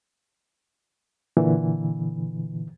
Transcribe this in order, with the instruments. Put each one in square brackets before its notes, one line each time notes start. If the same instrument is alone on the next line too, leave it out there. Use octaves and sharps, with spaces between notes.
[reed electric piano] A#2 D3 E3